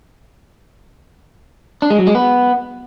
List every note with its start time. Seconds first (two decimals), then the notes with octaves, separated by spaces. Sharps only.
1.82 D4
1.90 G#3
1.99 F#3
2.07 G#3
2.15 B3